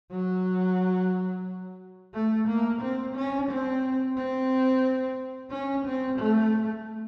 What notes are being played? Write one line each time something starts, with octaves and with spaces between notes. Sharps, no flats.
F#3
A3
A#3
C4
C#4
C4
C4
C#4
C4
A3